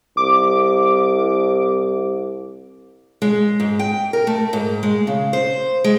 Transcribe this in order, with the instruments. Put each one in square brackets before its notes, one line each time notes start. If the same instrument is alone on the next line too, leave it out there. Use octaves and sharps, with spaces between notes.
[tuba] C2 [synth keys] D6
[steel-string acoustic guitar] G#3
G#2
G5
A#4
A3
G#2
G#3
C#3
C5
G#3